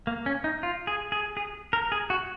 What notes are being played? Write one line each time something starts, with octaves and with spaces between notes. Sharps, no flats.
A#3
C#4
D#4
F4
G#4
G#4
G#4
A#4
G#4
F#4